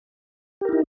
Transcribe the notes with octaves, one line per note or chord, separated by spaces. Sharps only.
D#4 E4 G4 A#4